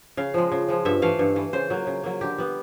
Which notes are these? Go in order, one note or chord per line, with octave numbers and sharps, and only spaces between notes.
C#3 F5
F3 G#3
C#3
F3 G#3
G2 E5
E3 A3 F5
G2
E3 A3
C#3 C5
F#3 A#3
C#3
F#3 A#3
D3 G4
G3 B3